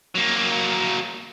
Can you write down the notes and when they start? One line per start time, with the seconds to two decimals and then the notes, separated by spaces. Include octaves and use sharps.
0.15 F#3 A#3